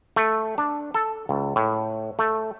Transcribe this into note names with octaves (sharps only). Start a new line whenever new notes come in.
A3
D4
A4
C#2
A2
A3